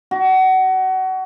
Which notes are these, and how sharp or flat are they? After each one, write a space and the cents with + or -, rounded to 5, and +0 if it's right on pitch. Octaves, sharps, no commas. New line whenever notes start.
F#4 +25